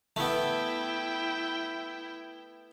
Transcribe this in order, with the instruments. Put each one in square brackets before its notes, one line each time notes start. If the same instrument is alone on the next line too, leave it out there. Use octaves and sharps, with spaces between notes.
[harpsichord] A3 B3 [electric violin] E4 G5